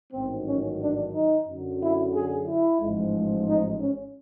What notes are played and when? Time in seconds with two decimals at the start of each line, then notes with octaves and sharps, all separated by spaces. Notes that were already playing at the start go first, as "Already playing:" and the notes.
0.12 A1 G#2 D#3 F#3 C4
0.45 C#4
0.80 D4
1.13 D#4
1.46 F#2 D3 F#3
1.80 E4
2.13 G#4
2.47 E4
2.80 A1 G#2 F3 G#3
3.47 D#4
3.81 C#4